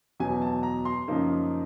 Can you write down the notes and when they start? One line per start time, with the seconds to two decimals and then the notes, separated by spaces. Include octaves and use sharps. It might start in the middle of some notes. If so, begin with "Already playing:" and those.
0.20 E2 B2 F#3 G#5
0.42 A5
0.63 A#5
0.85 C6
1.08 F#2 C#3 F3 A#3 D#4